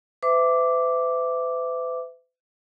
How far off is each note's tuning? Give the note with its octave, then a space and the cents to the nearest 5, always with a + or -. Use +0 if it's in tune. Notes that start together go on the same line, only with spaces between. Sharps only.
B4 +45 E5 +0 D6 -5